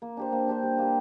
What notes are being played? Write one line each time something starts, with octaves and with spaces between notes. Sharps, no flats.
A#3
D4 G4 C5
A#3
D4 G4 C5
G3
A#3 G4